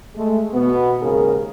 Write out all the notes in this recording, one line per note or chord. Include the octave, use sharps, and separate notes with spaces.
G#3 A3
B2 B3
D#2 G#2 C#3 G#4 A#4